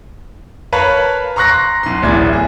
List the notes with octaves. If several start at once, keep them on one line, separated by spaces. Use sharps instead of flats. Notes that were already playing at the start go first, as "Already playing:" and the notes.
A#4 B4 C#5 F5 A5 B5
A#5 C6 C#6 F#6 A#6
B1 C6
D1 A1 E2 D5 E5 G#6
G#4